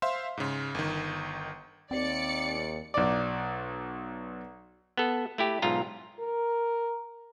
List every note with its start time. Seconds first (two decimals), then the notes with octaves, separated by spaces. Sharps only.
0.02 C5 E5 F5 C6
0.37 G#2 C#3
0.75 G1 D#3
1.91 D#2 C4 D5 C#7
2.94 B1 D5
4.98 B3 A4
5.38 A3 E4 G4
5.62 B1 G#2 F4 A#5
6.20 A#4